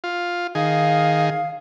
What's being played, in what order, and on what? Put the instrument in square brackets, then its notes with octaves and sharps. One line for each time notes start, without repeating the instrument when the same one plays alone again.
[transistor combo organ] F4
[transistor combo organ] D#3 G#4 [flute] F5